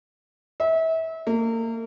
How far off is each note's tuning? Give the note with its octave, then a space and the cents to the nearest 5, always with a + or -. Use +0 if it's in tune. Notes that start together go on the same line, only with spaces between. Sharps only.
E5 -30
A#3 -35